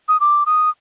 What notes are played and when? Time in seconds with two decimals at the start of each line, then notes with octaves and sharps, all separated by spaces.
0.08 D#6
0.20 D6
0.46 D#6